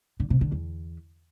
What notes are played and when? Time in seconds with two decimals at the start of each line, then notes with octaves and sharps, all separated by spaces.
0.20 D3
0.30 C3
0.41 D3
0.52 E2